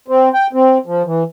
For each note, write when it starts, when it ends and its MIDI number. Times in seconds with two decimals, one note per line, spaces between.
0.08 0.29 60
0.34 0.47 79
0.53 0.78 60
0.86 1.02 53
1.06 1.23 52